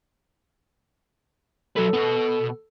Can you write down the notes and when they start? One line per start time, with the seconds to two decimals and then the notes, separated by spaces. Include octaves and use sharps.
1.77 F#3 A4 B4
1.94 B2 B3